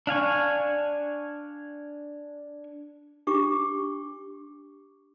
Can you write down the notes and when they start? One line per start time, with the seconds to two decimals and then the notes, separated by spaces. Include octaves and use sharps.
0.07 D4 F5 G#5 C#6
3.27 D4 G4 C#6 D6